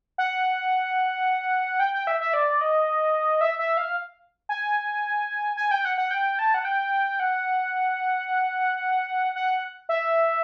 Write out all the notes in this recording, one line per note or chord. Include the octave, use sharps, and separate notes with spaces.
F#5
G5
G5
E5
E5
D5
D#5
E5
E5
F5
G#5
G#5
G5
F#5
F#5
G5
A5
F#5
G5
F#5
F#5
E5